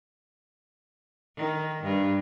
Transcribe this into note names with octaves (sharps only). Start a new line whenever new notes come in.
D#3
G2